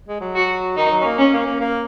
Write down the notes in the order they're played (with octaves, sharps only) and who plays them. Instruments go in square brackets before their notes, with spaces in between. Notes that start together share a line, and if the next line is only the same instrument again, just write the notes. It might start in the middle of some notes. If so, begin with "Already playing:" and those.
[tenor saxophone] G#3
F#3
[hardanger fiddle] F#4
[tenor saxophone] D#3 [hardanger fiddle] D#4
[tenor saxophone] F#3
C#4
A#3
[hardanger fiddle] C#4
[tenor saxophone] A#3
A#3
A#3